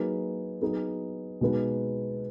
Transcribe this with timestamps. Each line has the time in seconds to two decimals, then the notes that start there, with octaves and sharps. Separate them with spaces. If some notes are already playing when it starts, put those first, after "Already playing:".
Already playing: F#3 A#3 D#4 G#4 B4
0.62 F#3 B3 D#4 G#4
1.41 B2 G#3 B3 D#4